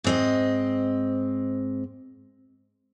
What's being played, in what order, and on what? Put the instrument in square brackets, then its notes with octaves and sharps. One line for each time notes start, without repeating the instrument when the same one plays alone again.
[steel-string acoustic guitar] G#2 C4 D#5